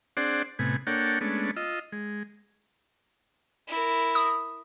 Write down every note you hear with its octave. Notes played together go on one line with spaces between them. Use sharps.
C4 D4 G#4 C5 D5 F#5
A2 C3 B3 G#5
A#3 D4 A4 C#5 F#5 G5
G#3 A3 B3 C#4 D4
F4 D#5 E6
G#3
E4 A#4
D#6